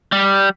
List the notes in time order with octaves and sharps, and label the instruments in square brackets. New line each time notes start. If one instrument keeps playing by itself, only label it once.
[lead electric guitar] G3